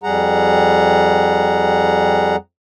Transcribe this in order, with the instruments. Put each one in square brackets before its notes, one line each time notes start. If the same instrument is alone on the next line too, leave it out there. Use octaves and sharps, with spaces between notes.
[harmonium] F2 G3 G#4 F#5 A#5